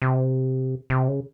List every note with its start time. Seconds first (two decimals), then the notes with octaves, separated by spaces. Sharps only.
0.02 C3
0.90 C3
1.08 C#3